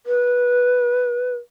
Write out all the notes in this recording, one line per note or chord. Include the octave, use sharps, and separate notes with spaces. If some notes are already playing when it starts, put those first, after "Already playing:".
B4